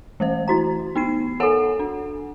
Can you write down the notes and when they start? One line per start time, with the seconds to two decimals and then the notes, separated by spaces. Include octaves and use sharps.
0.20 E3 A3 C5
0.48 E4 F#4 A#5
0.96 B3 D#4 C7
1.40 A4 A#4 C#5 F#5 G#5
1.79 D4